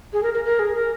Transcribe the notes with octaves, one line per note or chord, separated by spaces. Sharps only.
G#4
A#4
A#4
A#4
G#4
A#4